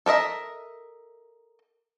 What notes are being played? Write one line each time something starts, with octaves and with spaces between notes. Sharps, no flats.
A4 A#4 D#5 E5